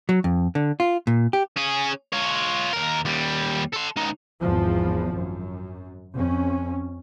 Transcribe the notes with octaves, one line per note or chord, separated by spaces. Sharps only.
F#3
F2
D3
F4
A#2
G4
C#4 G#4
F4 C#5
D#2 A#4
D#2 G3
A4 C6
C#2 D#4
G#1 E2 F3
F#2
F2 C#4